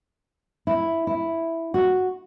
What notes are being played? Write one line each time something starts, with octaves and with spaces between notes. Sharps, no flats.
E4
E4
F#4